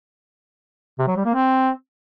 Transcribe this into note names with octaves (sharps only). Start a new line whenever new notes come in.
C3
F#3
G3
A#3
C4